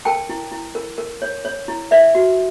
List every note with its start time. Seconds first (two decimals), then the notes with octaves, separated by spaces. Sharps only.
0.05 A#4 G5 A5
0.29 E4
0.52 E4
0.75 A#4
0.98 A#4
1.22 C#5
1.45 C#5
1.68 E4
1.91 B4 D5 E5
2.15 F#4